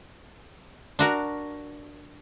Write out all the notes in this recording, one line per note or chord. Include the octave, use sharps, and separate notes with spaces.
D4 F#4 A#4